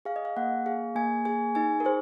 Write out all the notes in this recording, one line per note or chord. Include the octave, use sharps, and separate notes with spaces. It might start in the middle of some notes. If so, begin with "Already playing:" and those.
G#4 F5
D#5
F5
A#3 F#5
G#4 F5
A#3 G#5
G#4 G#5
D#4 G#5
A#4
G#4 C5